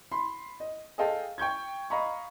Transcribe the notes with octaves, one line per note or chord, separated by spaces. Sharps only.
B5 C6
D#5
G#4 A4 D#5 F5 G5 A5
G5 C#6 G6 G#6
D#5 F5 A#5 B5 C#6